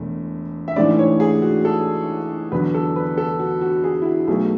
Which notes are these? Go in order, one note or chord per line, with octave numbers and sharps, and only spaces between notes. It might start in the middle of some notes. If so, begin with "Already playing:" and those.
Already playing: E1 E2 A3
E5
A1 G#2 E3 A3 D4 D5
C#5
G#4
F#4
A4
E2 D3 F#3 B4
A4
B4
A4
F#4
F#4
G#4
E4
F#4
B1 B2 F#3 A3 G#4